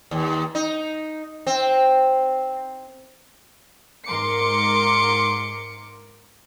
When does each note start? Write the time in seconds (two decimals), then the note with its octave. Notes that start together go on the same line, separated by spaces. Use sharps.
0.11 D#2
0.55 D#4
1.47 C4
4.06 G#2 A#4 C6 D6 C#7